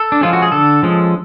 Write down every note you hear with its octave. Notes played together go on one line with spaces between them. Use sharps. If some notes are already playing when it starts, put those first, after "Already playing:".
Already playing: A4
D4
F3 G#3 C#4 F4
F#4
G#4
D3 A4
F3 G#3 C#4